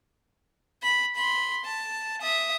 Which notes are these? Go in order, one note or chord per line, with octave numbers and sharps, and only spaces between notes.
B5
B5 C6
A5
E5 D#6